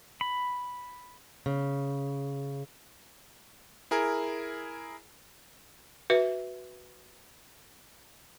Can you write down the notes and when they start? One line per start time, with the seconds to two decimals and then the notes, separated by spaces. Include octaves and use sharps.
0.21 B5
1.46 C#3
3.91 E4 G#4 A#4
6.10 F#4 B4 E5